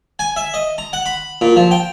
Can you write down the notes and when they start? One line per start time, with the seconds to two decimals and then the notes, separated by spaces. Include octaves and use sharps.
0.19 G#5
0.36 E5
0.54 D#5
0.78 A#5
0.93 F#5
1.06 B5
1.41 A#2
1.56 F3
1.71 G5